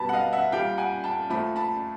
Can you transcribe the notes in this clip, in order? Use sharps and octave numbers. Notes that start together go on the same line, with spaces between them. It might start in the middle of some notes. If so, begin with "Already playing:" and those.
Already playing: B2 G3 A5 B5
F#5
D#5 F5
E5 F#5
A#2 G3 F5 G5
F#5 G#5
G5 A5
A#2 F3 A3 A5 B5
A5 B5